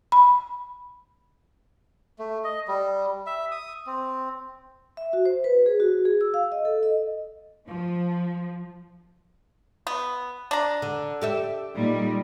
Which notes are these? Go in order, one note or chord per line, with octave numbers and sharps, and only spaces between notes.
B5
A3
D#5
G3
E5
D#6
C4
E5
F#4
C5
B4
G#4
F#4
G#4
E6
F5
D#5
A4
D#5
F3
B3
D4 A#5
D3
G4 A4 E5
A#2 G3 D#4